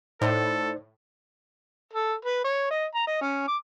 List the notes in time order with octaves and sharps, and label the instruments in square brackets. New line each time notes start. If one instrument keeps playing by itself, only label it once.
[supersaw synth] A2 [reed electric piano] D#4 C5 D5 [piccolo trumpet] A4
[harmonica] A4
B4
C#5
D#5
A#5
D#5
C#4
D6